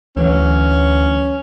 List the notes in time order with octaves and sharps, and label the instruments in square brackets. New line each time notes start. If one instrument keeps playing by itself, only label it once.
[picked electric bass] D2 E3 F#3 [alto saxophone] C#4